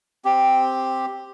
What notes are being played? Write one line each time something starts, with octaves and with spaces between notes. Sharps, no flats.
C4 G4